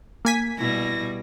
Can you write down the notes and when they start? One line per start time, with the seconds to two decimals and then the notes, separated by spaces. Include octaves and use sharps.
0.25 A#3 G#5 B6
0.58 B2 G3 E4 A#6